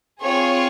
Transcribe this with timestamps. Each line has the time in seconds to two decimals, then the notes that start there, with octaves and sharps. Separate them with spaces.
0.21 C4 F4 G#4 C#5